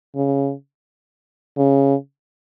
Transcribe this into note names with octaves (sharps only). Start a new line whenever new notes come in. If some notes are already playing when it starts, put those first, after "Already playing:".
C#3
C#3